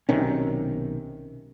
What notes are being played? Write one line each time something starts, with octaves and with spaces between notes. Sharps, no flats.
B1 C3 D#3 C#4